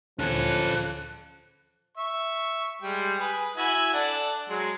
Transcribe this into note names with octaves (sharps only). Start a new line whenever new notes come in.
D2 D3 F3 C#4 A4 F#6 G#6
E5 C#6
G3 G#3 G5
G#4 B4
E4 F#4 G#5
D4 A4 F#5
F#3 G#3